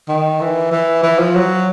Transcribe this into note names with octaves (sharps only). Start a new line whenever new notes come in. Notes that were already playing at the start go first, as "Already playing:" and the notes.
D#3
E3
E3
E3
F3
F#3